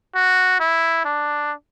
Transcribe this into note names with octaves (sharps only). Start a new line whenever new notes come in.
F#4
E4
D4